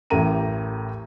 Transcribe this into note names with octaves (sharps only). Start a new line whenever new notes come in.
A1 A2 G4 A#4 A#5 D#7